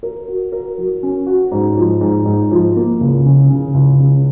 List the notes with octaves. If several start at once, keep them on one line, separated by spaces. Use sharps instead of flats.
A#4
F#4
A#4
F#3
C#4
F#4
G#2
F3
G#2
G#2
F3
A#3
C#2
C#3
C#3
C#2
C#3